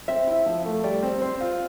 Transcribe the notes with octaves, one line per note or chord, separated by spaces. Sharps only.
C4 E5
E4
F3
A3
G3 D5
C4
C4 C5
F4